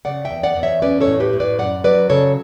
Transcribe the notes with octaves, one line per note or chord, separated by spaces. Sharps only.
C#3 D5 F#5
E5 G5
E2
D5 F#5
E2
C#5 E5
C#4 B4 D5
A4 C#5
A2
G4 B4
A2
B4 D5
F#2 D5 F#5
F#3 B4 D5
C#3 A4 C#5